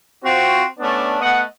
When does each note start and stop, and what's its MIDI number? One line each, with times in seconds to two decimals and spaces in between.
0.23 0.64 60
0.23 0.64 65
0.23 0.64 66
0.79 1.20 57
0.79 1.20 59
0.79 1.20 61
0.79 1.20 62
1.21 1.42 57
1.21 1.42 59
1.21 1.42 75
1.21 1.42 78